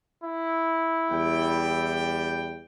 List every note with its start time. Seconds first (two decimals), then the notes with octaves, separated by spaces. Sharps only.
0.23 E4
1.11 E2 G3 G5